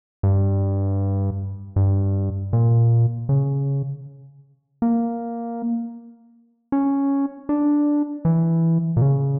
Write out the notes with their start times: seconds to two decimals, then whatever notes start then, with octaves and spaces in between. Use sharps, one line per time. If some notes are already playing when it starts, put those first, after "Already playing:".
0.23 G2
1.76 G2
2.53 A#2
3.29 C#3
4.82 A#3
6.72 C#4
7.49 D4
8.25 E3
8.97 A#2
9.02 C#3